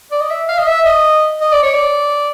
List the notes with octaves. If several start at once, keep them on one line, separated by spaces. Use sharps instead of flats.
D5
D#5
E5
F5
D#5
E5
D#5
D#5
D5
C#5
D5